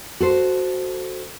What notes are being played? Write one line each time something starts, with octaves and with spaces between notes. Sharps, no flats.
F#4 A4 C5